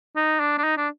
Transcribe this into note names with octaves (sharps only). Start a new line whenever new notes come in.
D#4
D4
D4
D#4
D4